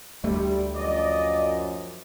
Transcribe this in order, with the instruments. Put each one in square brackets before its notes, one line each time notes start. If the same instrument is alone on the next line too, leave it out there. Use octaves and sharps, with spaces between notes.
[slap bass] D2 A3 [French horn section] G3
[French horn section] F#2 F3 [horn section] D5 D#5